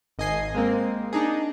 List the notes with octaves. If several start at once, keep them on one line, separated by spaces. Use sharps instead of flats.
G#1 D#5 G#5 C7
G#3 A#3 C4
D4 D#4 G#4